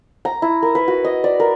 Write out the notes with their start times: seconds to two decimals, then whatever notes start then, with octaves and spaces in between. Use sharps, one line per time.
0.25 A#5
0.42 E4
0.63 A#4
0.75 B4
0.88 F#4
1.05 D#5
1.24 D5
1.40 A#4